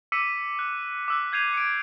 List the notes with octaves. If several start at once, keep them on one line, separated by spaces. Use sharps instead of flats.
D6 E6 B6 C#7 D#7
F#6
D6 E6 F#6
E6 G6 G#6 C7 D#7 F7
C#7 D7